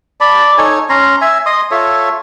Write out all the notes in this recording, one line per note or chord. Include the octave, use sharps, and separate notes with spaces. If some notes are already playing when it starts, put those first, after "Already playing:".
D5 A5 B5
D#4 A4 C#5 G#5
C#4 A#5 C6
E5 G#5
D#5 C6 D#6
F4 A4 C#5 E5